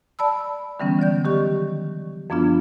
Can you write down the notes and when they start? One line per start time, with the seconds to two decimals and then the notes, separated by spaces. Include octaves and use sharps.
0.19 D5 A5 B5 E6
0.80 D3 E3 G3 B3 C#4
0.99 D3 F#3 D5 G6
1.25 D#3 G4 C#6
2.30 F#2 F3 B3 D4 F4